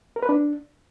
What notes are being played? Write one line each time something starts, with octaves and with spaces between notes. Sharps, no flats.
A#4
B4
D4